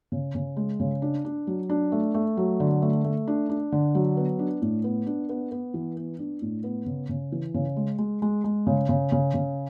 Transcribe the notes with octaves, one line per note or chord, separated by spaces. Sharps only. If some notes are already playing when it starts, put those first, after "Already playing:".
C#3
C#3
G#3
C#3
D4
D4
F#3
D4
A3
A3
F#3
D3
A3
A3
D4
D4
D3
F#3
B3
D4
A2
B3
D4
B3
B3
E3
B3
D4
A2
B3
C#3
C#3
E3
C#3
G#3
G#3
G#3
G#3
C#3
C#3
C#3
C#3